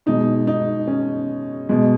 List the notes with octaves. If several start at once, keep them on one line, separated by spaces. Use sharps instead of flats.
B2 G#3 D#4
D#4
C#4
B2 G#3